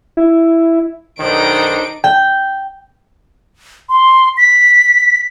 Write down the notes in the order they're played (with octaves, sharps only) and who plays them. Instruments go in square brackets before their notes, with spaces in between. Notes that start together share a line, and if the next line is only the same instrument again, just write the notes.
[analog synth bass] E4
[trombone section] B1 D#3 [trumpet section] G3 D4 C5 [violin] D#4 D7
[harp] G5
[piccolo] C6
B6